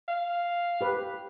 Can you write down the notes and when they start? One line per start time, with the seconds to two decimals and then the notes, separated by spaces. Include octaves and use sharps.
0.08 F5
0.81 G4 B4